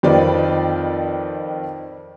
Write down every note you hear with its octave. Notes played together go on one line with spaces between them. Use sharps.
F2 D#3 C4 F4 B4 D5